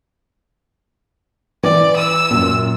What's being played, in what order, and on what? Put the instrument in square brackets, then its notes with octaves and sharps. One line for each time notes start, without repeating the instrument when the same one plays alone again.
[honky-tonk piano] E3 [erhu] D5
[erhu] E6
[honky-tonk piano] F#2 A#2